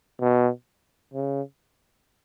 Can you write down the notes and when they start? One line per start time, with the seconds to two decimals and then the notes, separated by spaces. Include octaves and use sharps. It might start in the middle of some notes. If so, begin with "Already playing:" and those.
0.21 B2
1.14 C#3